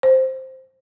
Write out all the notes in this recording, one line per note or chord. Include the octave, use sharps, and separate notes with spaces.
C5